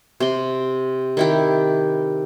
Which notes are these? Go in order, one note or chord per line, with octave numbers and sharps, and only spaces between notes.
C3 C6
D#3 E4 G4